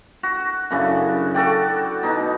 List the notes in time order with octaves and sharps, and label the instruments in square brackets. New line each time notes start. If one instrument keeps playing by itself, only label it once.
[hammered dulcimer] F#4
F#2 C#3 D4 E4
F#4 A4 D5 G5
B2 D#4